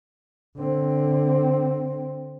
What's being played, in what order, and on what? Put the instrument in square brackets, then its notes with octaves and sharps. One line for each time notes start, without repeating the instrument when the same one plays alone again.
[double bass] D3 C4